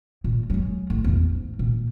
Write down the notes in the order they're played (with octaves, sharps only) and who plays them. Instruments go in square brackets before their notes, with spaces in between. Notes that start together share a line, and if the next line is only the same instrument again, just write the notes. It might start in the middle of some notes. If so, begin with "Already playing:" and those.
[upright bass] A#2
F#3 G#3
A1
A1 E2
G#2
A#2